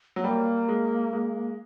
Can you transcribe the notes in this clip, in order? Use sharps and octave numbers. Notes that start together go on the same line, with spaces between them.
F#3 B3
G3 A#3
G#3
G#3